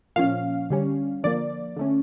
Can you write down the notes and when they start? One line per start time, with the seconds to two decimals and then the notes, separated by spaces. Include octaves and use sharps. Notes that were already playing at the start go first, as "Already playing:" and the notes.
0.16 A#2 F3 C#4 F5
0.70 D3 G3 C#4
1.24 D3 F3 A#3 D5
1.76 D3 A3 C#4